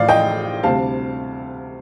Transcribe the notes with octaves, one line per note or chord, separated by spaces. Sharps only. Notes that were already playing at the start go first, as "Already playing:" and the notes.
Already playing: A1 A2 F3 C5 D5 F5
D#5 G5
D2 C3 G3 C4 F5 A5